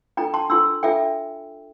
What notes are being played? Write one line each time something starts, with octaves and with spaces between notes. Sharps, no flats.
D4 F4 A4 G5 A#5
A5 C6
D4 F4 A4 C6 E6
D4 F4 A4 E5 G5